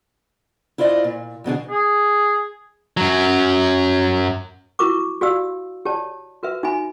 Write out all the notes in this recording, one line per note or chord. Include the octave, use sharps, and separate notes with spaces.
E4 F4 C5 D5 D#5
A#2
F2 B2 D3 G#4
G#4
F#2 F#3
E4 F#4 A#4 C#6 D6
F#4 G4 D5 F5 E6
G4 C#5 D5 A5
F#4 A#4 B4 E5
D#4 F#4 E5 G#5 B5